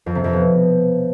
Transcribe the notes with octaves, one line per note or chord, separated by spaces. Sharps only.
F2
C3
F2
B2